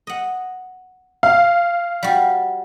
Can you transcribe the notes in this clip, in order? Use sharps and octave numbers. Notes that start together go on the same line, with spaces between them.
D#5 F#5
F5
G3 F#4